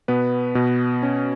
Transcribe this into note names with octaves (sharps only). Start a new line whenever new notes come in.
B2 B3 B4
B2
C#4